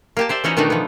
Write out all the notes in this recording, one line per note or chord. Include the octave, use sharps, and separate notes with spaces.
A#3 G4 A5
G4 C5 D5 E5
E3 C#4 D#4 F#4
B2 D#3 E3 A3 D4 D#4
F3 B3